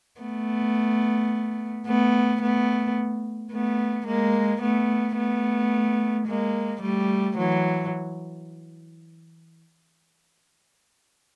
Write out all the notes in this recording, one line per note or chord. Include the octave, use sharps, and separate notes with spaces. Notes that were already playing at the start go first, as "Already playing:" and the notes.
A3 B3
A3 B3
A3 B3
A3 B3
G#3 A#3
A3 B3
A3 B3
G#3 A#3
G3 A3
E3 F#3